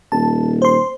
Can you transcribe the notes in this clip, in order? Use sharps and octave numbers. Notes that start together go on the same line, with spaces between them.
D#1 A5
C5 C6